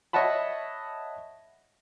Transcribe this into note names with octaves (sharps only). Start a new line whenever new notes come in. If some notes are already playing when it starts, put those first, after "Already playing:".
C#5 D#5 E5 F#5 A5 B5